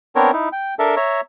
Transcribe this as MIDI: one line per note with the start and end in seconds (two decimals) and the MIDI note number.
0.16 0.31 59
0.16 0.31 60
0.16 0.31 62
0.16 0.31 70
0.16 0.31 73
0.33 0.49 63
0.33 0.49 64
0.53 0.74 79
0.79 0.96 62
0.79 0.96 69
0.79 0.96 70
0.79 0.96 76
0.97 1.21 73
0.97 1.21 76
0.97 1.21 82